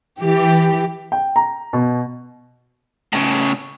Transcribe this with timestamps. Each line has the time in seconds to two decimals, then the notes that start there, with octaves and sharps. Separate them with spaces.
0.21 E3 G4
1.12 G5
1.36 A#5
1.73 B2
3.13 A2 C#3